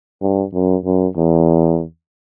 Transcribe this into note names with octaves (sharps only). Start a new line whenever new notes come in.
G2
F#2
F#2
E2